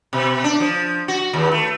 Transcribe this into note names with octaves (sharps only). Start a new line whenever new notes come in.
B2
D4
F3
F#4
D#2
A3